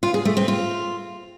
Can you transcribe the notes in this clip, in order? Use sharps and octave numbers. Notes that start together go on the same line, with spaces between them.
F4
G#4
A3
C4
F4